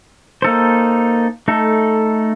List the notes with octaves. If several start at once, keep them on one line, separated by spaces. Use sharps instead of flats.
A#3 D#4 A4 C5
A3 D#4 A4